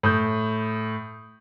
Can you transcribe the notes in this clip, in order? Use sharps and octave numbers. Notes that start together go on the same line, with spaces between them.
A2 D#6 G6